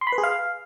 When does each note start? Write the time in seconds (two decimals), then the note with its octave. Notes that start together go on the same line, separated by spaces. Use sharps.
0.01 C6
0.07 B5
0.12 B4
0.18 G#4
0.23 F5